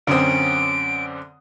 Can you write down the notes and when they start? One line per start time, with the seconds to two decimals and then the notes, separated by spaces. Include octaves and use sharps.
0.07 F#2 D3 C4 C#4 D#6 D7